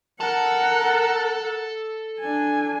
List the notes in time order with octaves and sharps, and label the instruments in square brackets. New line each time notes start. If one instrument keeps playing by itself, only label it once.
[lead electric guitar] A4 A5 [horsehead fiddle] A#4 F#5
[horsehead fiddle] D4 G#5